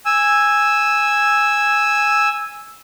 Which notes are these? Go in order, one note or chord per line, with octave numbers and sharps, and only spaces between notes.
G#5 E6